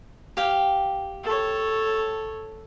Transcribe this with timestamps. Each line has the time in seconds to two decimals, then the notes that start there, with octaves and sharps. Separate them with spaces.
0.37 G4 F5 G5
1.24 A4 C#5